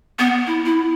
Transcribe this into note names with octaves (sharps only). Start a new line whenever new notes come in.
B3
E4
E4